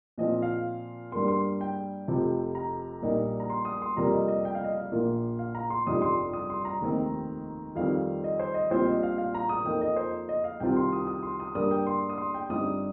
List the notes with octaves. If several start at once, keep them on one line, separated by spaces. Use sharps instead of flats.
A#2 F3 C4 F4 D#5
F5
G2 G3 A#3 C6
C6
G5
F1 F2 C3 F3
A#5
A#1 A#2 G3 A#3 D#4
A#5
C6
D#6
C6
F2 C3 G3 A#3 A#5
D#5
D#5
G5
F5
D#5
F5
A#1 A#2 A#3 F4
F5
A#5
C6
G1 F2 C3 G3 D#4 D#6
C6
D#6
C6
A#5
F1 D#2 D#3 C4 D#4
F2 D#3 G3 C4 F5
D#5
C5
D#5
A#1 A#2 G3 C4 F4 C5
D#5
F5
F5
A#5
D#6
F2 F3 A#3 D#4 G5
D#5
C5
D#5
F5
C2 C3 D#3 C4 F4 G5
C6
D#6
D#6
C6
D#6
G2 G3 A#3 D#6
G5
C6
D#6
C6
G5
G1 G2 G3 C4 D#4 D#6